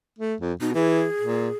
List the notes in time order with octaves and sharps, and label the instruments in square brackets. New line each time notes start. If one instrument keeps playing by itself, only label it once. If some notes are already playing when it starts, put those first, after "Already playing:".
[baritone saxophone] A3
F2
[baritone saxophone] B2 [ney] D#4
[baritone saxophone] E3 [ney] G#4
[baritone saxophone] A#2